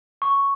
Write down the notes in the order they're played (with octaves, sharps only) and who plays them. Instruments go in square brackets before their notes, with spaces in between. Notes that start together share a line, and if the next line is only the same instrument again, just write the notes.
[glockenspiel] C#6